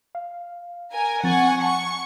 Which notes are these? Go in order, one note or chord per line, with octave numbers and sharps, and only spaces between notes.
F5
A#4 G#5
F3 C4 F#5 G#5 C#6 A6
A5 C#6 C#7